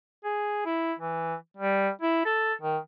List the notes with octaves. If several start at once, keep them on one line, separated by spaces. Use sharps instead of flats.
G#4
E4
E3
G3
E4
A4
D#3